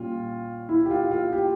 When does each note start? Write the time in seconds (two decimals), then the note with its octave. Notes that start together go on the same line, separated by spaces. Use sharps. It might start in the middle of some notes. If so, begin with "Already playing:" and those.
Already playing: A#2 G3 C#4 F4
0.69 E4
0.86 G4
0.91 F4
1.11 F4
1.33 G4